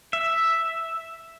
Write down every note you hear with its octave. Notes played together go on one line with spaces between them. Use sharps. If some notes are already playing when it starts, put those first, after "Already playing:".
E5